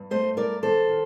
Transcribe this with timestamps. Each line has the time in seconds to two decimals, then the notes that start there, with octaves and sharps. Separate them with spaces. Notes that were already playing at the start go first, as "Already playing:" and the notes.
Already playing: G2
0.11 A3 C5 D#5
0.37 G2 A#4 D5
0.62 D#3 A4 C5
0.89 D#3